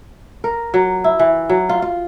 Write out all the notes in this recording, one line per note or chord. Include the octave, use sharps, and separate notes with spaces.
A#4
F#3
E4
E3
F#3
F4
F4